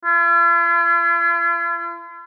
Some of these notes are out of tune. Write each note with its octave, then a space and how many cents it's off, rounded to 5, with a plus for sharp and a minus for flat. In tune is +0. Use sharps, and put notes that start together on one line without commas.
F4 -45